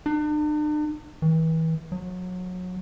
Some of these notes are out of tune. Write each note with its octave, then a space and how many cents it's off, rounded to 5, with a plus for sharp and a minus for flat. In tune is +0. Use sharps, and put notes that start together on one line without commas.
D4 +45
E3 -35
F#3 -25